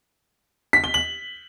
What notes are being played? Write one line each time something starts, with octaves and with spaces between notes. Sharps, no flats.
B6
G7
F#7